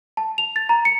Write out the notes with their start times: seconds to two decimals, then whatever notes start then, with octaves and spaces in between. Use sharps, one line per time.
0.17 A5
0.38 F7
0.56 A6
0.69 A#5
0.85 C#7